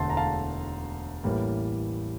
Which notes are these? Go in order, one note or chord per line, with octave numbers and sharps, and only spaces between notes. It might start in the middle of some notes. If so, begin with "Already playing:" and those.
Already playing: E1 D2 D3 A3 A5 C6
A#5
F5 A5
A1 A2 E3 G3 A#3